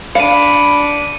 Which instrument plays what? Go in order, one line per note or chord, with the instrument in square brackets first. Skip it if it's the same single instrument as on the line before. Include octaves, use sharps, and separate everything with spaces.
[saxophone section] D4 [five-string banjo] F5 [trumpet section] B5 [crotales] C#7 D#7